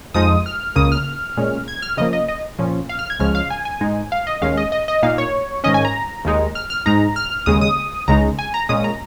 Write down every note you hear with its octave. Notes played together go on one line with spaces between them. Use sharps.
F2 F3 G#3 D#4 D#6
F6
C#2 C#3 A#3 D#6
F6
A#2 G#3 C#4
G#6
F6
C#3 F3 A#3 D#5
D#5
D#5
A#2 F3 C#4
F5
F6
G#6
C#2 C#3 F3 G#3 C#4 F6
F5
G#5
G#5
G#2 G#3 D#4
F5
D#5
D#2 D#3 G#3 C#4 F5
D#5
D#5
D#5
A#2 A#3 D#4 F5
C#5
G#2 D#3 C#4 D#5
G#5
A#5
D#2 D#3 G#3 D#4
F6
F6
G#2 G#3 D#4 A#5
F6
D#2 C#3 G#3 D#6
D#6
C#2 C#3 G#3 D#4 A#5
G#5
A#5
A#2 G#3 C#4 D#6
A#5